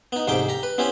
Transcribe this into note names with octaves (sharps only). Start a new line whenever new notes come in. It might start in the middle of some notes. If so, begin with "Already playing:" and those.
B3 D#4
D2 G#2 C3 D#4 G5 D6
G4 A#5
B4
B3 C#4 E4 G4 C5